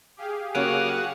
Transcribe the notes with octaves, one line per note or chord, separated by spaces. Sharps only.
G4 G#4 F5
C#3 F#3 A#3 F#4 D6 D#6 F6